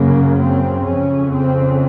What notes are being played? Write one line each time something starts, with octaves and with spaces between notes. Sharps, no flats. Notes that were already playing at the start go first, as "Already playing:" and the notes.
Already playing: F#2 C#3 A#3
C4
F2 C#3 C#4
C4